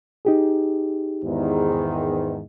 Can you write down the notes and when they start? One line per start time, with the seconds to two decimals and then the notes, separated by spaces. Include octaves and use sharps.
0.25 D#4 G4 G#4
1.23 E2 G#2 D#3